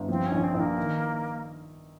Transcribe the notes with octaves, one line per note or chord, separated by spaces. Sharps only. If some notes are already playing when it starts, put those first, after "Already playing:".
Already playing: G1
F3 C4
C#4
A#1
C4
A#1
A#3
D#3